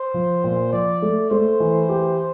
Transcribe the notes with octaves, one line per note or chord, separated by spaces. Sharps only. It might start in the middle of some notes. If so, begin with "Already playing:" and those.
Already playing: C5
F3
A#2
F3 D5
A3
A3 C5
E3
G4